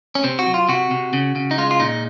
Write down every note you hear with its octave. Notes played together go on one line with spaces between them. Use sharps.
C#4
C3 C4
F#4
F#3
F4
C3 F#4
C3
C#3
C#3
D#4
G#3 F4
F4
A#2 D#4